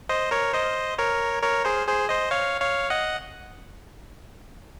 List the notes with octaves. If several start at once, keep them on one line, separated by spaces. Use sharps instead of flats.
C5 D#5
A#4 C#5
C5 D#5
A#4 C#5
A#4 C#5
G#4 C5
G#4 C5
C5 D#5
C#5 F5
C#5 F5
D#5 F#5